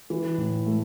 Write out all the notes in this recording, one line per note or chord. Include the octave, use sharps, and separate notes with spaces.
E3
A2
A3